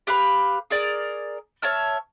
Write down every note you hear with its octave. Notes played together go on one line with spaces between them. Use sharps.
G4 B4 F5 B5
G#4 A#4 D5
C#5 E5 A5 F6